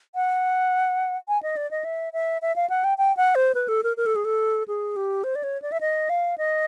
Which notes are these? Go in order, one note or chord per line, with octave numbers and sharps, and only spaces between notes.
F#5
G#5
D#5
D5
D#5
E5
E5
E5
F5
F#5
G5
G5
F#5
C5
B4
A4
A#4
A#4
A4
G#4
A4
G#4
G4
C5
D5
C#5
D5
E5
D#5
F5
D#5